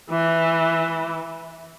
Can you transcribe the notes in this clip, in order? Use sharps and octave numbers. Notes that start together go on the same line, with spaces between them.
E3